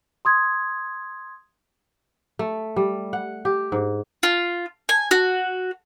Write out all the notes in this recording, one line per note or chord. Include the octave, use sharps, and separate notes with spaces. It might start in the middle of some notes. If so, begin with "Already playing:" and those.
C6 D#6 G#6
A3
G3
F#5
G4
G#2
F4
G#5
F#4